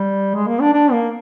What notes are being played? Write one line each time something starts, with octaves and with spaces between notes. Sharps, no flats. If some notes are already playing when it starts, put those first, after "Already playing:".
Already playing: G3
G#3
A#3
D4
D4
A#3